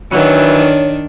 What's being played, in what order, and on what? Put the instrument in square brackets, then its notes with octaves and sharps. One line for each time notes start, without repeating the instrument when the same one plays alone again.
[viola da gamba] D#3 D4 [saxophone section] E3 F#3 [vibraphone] C#5